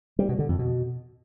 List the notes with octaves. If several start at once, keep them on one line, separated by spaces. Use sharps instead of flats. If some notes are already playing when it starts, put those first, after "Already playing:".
G3
B2
D3
F2
B2